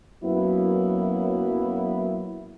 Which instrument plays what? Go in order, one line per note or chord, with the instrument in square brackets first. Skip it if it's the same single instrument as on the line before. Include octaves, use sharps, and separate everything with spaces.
[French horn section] F#2 F#3 A#3 B3 E4